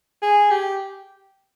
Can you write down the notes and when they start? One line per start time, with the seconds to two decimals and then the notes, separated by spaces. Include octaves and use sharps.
0.23 G#4
0.50 G4